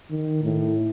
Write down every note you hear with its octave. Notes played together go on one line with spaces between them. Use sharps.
D#3
A2